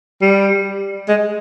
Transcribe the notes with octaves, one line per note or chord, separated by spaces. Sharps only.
G3
G#3